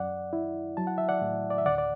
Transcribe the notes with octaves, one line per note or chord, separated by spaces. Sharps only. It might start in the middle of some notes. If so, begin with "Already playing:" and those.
Already playing: F#2 D5 F#5
E4
F#3 A5
F#5
E5
D5 F#5
A2
D5
E5
D2 D5 F#5
D5